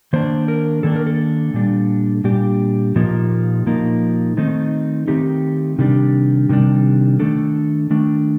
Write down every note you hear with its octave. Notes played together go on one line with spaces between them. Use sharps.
D#3 A#3 D4 C5
A#4
D#3 A#3 D4 A4
A#4
A4
A#2 G3 D4
A#2 G3 D4 G4
A#2 F3 A#3 D#4
A#2 F3 A#3 D#4
D#3 A3 C4 D#4
D#3 A3 C4 D#4 G4
C3 D#3 G3 D4
C3 D#3 G3 D4
D#3 A3 D4 A4
D#3 A3 D4